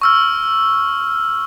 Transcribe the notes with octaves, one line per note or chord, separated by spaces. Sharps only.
C#6 E6 F6